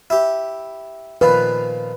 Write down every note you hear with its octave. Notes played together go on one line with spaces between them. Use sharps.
E4 G4
A#2 D#3 F3 B4